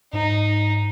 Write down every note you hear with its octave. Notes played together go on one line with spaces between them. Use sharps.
G#2 D#4